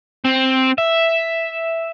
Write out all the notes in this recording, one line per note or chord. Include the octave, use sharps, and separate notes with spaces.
C4
E5